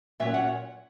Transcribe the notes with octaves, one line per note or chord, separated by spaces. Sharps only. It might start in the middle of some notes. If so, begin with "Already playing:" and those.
A#2 F#3 C#4 E5
F#5